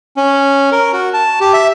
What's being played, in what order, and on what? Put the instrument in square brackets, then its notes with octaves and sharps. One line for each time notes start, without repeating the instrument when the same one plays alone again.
[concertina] C#4
A#4
F#4
A5
G4
E5